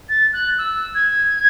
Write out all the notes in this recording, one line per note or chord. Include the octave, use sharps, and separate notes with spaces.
A6
F#6
E6
G#6